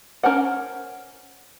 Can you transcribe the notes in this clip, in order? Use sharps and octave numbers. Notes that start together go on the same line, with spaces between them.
C#4 A#4 C5 F#5